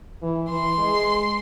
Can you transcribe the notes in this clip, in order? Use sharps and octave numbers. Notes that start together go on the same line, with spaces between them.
E3
E3 C6
G#3